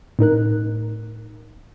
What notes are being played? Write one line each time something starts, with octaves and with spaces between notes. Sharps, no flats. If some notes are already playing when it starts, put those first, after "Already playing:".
A2 D#4 A#4 F#6